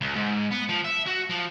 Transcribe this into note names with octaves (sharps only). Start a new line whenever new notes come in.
C#2
G#2
B3
F3
E5
F#4
F3